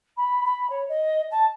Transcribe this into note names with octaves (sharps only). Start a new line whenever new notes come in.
B5
B5
C#5
D#5
A5